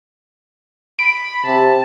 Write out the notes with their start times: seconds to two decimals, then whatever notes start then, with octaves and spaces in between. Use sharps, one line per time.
0.99 B5 D7
1.45 C3 A5